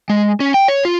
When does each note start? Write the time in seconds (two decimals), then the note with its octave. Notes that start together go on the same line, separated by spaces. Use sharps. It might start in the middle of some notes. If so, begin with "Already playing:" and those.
0.09 G#3
0.40 C#4
0.54 G5
0.68 C#5
0.85 F4